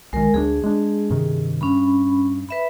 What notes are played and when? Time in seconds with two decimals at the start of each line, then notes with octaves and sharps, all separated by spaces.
0.13 B1 D#3 G#3 A#4
0.34 D2 G#3 D4 G#4
0.64 G#3 D4
1.10 G2 C3 D#3
1.61 G2 C#4 B5
2.49 B4 E5 B5